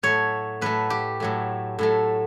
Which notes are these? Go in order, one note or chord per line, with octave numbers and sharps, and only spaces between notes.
A2 F#3 A3 C#5
A2 F#3 A3 B4
G4
A2 F#3 A3
A2 F#3 A3